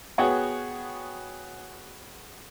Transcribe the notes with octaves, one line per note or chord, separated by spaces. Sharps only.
B3 F#4 G#4 C#5 F#5 G5